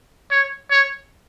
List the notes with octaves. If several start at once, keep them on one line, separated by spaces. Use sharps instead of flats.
C#5
C#5